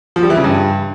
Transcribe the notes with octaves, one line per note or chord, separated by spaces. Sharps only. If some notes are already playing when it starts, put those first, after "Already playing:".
F3
G3
E3
C#3
G2